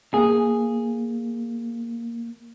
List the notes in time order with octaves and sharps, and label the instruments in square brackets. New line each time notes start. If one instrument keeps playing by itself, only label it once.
[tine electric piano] A#3 [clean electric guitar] G#4